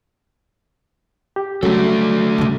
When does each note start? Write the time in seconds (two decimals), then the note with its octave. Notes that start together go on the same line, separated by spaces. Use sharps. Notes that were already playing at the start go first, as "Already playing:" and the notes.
1.36 G4
1.63 C#3 F#3 G3 A3 C#4 F#4 A4
2.38 G2 C#3